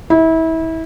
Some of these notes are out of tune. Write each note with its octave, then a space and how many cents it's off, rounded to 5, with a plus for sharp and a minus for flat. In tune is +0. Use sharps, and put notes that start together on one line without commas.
E4 -30